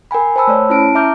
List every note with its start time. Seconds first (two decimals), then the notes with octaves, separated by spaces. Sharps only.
0.11 A#4 G5 G#5 B5
0.36 C5 G5 A5 B5 E6
0.47 A3 C#5 D5
0.69 C#4 E4 A5 D7
0.95 E5 A#5 D6 F6 G6